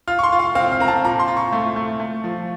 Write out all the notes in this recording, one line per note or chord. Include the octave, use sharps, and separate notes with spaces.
F4 F6
C#6
C6
F4
F5
C4 F5
F5
C4 A#5
A5
A#2 A#5
C6
F4
C#6
A3
A3
A3
F3